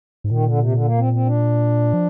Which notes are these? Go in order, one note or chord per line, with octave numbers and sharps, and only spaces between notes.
G#2
A#2 D#3
D3
C3
D3
A#3
C4
C4
D4
F3